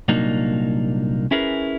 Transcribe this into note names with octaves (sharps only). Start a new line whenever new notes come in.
C2 A#2 F#3 A#3 D4 D#4
C#4 E4 G#4 A#4 B4